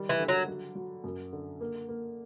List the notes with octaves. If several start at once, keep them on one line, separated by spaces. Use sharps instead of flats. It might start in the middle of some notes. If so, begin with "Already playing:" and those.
Already playing: D#3 G3
E3
D3
F#3
F#3
F#3
F#2
D3
A#3
A#3